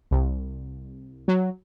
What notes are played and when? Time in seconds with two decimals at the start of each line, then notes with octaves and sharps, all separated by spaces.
0.11 C2
1.28 F#3